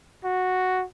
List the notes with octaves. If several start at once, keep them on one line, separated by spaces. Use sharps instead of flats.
F#4